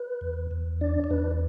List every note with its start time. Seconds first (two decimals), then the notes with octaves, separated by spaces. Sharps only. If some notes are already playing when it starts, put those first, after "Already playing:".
Already playing: B4
0.21 E2
0.51 E2
0.81 D4 D5
1.04 D5
1.10 E2 B4